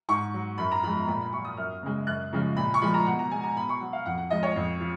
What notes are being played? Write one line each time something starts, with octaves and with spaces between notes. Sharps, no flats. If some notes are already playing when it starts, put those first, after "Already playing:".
G#2 C#6
F#3
F#2 B5
A#5
F3 G#3 B5
A#2 B5
B5
F#3 C#6
D#6
F#2 F6
C#3 G#3
F#2 F#6
C#3 F3 G#3
A#2 B5
C#6
F3 G#3 B5
A#5
B2 F#5
A#5
G#3 G#5
A#5
B2 B5
C#6
F#3 F#5
F5
F2 F#5
F#5
F3 G#3 D#5
C#5
F2
F3